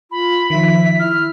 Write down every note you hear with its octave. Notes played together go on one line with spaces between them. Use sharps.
F4 B5
D#3 F3 E5 B6
E4 F6